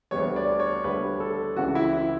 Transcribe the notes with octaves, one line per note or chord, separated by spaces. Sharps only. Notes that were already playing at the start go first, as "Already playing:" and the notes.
D2 D3 G3 B3 C#5
D5
C#5
D2 D3 G3 B3 B4
A4
C#2 C#3 E3 F#4
E4
E4